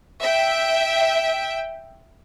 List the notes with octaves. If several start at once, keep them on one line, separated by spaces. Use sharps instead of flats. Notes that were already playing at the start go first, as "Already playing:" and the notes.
E5 G5